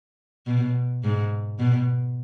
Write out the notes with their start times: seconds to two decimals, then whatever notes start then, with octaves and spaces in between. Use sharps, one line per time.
0.47 B2
1.04 G#2
1.59 B2